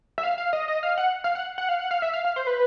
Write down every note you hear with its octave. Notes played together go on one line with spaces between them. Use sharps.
E5
F5
F5
D#5
D#5
F5
F#5
F5
F#5
F#5
F5
F#5
F5
E5
F5
F5
C5
B4